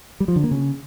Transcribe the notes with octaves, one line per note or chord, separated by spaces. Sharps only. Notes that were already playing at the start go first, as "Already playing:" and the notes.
G3
F3
D3
A#3
C#3